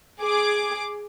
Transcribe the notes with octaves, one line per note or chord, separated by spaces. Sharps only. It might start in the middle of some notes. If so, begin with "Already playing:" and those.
G#4 D6